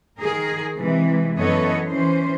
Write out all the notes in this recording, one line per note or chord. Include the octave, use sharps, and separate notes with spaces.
D#3 G#4 A#4
C3 E3 G#3
F#2 E3 B3 A4 C#5 D#5
E3 C#4 C5